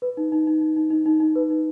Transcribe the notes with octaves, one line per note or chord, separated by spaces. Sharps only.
B4
D#4
D#4
D#4
D#4
D#4
D#4
D#4
D#4
B4
D#4